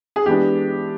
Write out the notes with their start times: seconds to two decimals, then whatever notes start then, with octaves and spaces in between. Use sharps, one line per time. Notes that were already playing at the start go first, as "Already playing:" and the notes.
0.16 G#4
0.26 E3 G#3 B3 D4 G4